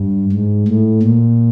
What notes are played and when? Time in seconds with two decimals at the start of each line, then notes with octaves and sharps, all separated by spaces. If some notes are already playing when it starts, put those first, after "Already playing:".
Already playing: G2
0.33 G#2
0.68 A2
1.03 A#2